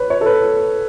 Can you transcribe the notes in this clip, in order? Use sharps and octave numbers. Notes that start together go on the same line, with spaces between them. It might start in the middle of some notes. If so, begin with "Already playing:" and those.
Already playing: B4 C#5
C#5
A4
B4